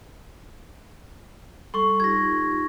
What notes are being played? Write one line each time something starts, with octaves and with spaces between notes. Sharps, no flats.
G3 A4 C6 C#6
D#4 F4 G4 G#6 A#6